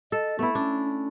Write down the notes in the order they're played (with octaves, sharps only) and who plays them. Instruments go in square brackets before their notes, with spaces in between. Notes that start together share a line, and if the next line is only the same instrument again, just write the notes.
[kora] A4 [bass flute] D#5
[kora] A3 E4 [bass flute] B3
[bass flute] C#4 [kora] D4